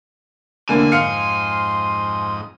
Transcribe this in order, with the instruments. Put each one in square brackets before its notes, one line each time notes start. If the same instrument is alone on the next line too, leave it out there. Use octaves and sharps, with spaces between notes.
[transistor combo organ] F2 A3 E4 [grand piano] D3 A#3 [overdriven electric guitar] G#5
[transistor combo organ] F2 G#2 D#6 [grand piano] F5 F6 C#7 [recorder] C6